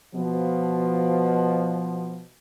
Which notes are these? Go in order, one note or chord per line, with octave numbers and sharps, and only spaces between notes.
B2 F3